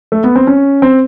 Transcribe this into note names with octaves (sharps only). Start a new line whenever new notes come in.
A3
B3
C4
C#4
C4